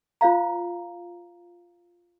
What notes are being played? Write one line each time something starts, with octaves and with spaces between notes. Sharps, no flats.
F4 C5 F5 A#5